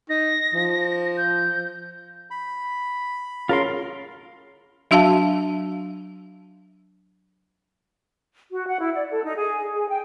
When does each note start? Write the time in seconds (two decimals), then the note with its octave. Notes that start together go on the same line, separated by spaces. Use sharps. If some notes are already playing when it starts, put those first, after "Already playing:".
0.09 D#4 A#6
0.54 F3
1.17 G6
2.30 B5
3.49 C#3 F4 A#4 C6
4.91 F#3 D4 F#4 E5 F5 A5
8.52 F#4
8.67 F#5
8.81 E4
8.94 D5
9.10 A4
9.24 D#4
9.36 G#4
9.71 G#4
9.89 G5